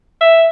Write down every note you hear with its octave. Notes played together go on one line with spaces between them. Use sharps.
E5